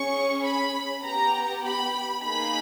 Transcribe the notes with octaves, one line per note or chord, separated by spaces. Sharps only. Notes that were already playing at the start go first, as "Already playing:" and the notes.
Already playing: C#4 G#4 C#6
B5
B3 G4 A#5
B5
A#3 D#4 G#4 B5